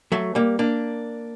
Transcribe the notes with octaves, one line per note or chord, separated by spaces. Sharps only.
F#3 A3
G3 A#3
A#3 D4